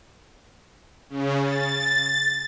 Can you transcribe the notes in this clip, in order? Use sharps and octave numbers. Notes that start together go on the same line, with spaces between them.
C#3
A6